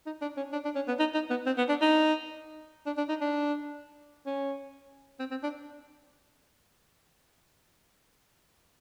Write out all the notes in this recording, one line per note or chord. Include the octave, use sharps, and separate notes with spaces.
D#4
D4
C#4
D4
D4
C#4
B3
D#4
D#4
B3
C4
B3
D4
D#4
D4
D4
D#4
D4
C#4
C4
C4
D4